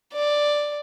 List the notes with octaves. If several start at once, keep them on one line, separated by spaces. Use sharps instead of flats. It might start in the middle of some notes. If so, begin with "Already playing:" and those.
D5